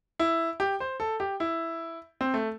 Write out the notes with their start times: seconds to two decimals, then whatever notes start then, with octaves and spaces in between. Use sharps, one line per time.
0.20 E4
0.60 G4
0.80 C5
1.00 A4
1.20 G4
1.40 E4
2.21 C4
2.34 A3